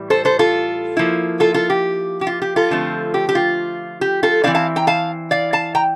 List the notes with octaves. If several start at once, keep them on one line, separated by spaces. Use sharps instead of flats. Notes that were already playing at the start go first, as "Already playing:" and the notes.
Already playing: A2 E3 G3
A4 C5
A4 C5
F4 A4
F3 A#3 E4
F4 A4
F4 A4
G4
G4
F4
G4
F4 A4
D3 F3 A3 C4
G4
G4
F4
G4
F4 A4
E3 A3 C4 E4 D5 F5
F5 A5
G5 A#5
F5 A5
D5 F5
F5 A5
G5 A#5